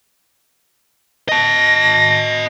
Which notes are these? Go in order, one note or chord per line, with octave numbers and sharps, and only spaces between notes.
D#5 A5 A#6